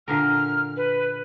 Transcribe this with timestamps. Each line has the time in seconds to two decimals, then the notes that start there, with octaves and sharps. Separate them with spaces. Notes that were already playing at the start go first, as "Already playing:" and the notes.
0.08 A#2 D3 A#4 F6
0.77 B4